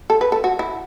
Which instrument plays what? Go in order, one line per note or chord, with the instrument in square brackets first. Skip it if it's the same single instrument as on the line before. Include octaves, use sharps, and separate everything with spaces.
[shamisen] A4
B4
A4
F#4
E4